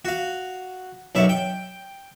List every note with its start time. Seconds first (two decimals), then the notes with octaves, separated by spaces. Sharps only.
0.05 F#4 F5
1.15 B1 F#2 E5 C#6
1.29 G5